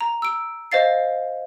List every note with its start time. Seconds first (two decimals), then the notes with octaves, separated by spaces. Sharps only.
0.01 A#5
0.22 E6 D7
0.72 C5 D#5 F5 A6 C7